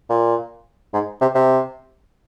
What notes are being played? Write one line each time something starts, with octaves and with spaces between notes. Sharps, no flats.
A#2
G#2
C3
C3